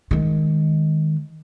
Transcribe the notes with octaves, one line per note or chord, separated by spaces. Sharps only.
D#3 G#3